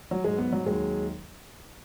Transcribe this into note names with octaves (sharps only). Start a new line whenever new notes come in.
F#3
G#2 F#3 G#3
B3
F#3
D#2 D#3 F#3 G#3